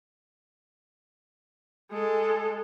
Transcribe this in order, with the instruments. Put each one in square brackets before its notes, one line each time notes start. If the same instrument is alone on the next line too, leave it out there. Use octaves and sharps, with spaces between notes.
[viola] G#3 A4